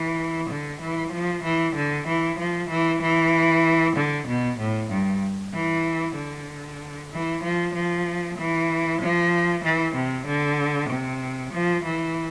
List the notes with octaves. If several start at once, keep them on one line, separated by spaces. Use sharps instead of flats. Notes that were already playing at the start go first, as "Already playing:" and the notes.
Already playing: E3
D3
E3
F3
E3
D3
E3
F3
E3
E3
D3
B2
A2
G2
E3
D3
E3
F3
F3
E3
F3
E3
C3
D3
C3
F3
E3